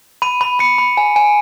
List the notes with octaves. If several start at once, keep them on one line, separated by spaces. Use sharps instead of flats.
B5 D#7
B5
B5 C#7
B5
G#5
G#5